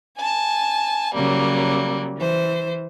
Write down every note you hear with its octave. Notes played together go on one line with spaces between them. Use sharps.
G#5 A5
C#3 F#3 G3 A#3
E3 C5